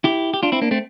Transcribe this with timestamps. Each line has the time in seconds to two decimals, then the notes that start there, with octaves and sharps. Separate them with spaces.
0.04 E4 G4
0.34 G4
0.43 D4 F4
0.52 C4 E4
0.62 A#3 D4
0.71 A3 C4